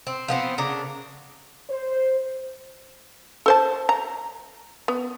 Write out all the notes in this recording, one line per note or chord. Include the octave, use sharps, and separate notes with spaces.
C4
F3 B3 C4
C#3 D4 A#4
C5
A4 C5 A5
A#5
B3